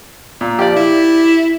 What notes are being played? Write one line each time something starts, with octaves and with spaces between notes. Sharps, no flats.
A#2
F3 G4 D5
E4